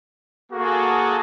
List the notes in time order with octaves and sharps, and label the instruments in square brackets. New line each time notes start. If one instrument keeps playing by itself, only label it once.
[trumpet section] A#3 F#4 [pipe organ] G#4 A4